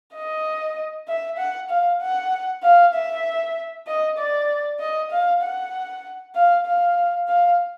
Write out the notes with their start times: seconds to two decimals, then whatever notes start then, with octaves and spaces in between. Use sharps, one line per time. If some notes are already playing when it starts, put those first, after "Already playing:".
0.14 D#5
1.08 E5
1.38 F#5
1.70 F5
2.01 F#5
2.63 F5
2.94 E5
3.87 D#5
4.18 D5
4.80 D#5
5.11 F5
5.42 F#5
6.35 F5
6.66 F5
7.28 F5